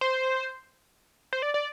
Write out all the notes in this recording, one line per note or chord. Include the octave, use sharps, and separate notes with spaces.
C5
C5
D5
D5